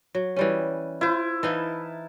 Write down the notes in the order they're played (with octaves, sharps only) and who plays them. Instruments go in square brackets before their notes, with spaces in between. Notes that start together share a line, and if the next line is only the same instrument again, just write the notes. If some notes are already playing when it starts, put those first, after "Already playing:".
[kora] F#3
E3 G3 C#4
[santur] E4 [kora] F4 C5
[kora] E3 D#4 F5 [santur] A5